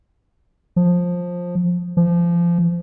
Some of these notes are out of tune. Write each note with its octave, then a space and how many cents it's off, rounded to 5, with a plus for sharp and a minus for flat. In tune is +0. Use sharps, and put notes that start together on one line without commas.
F3 +15
F3 -25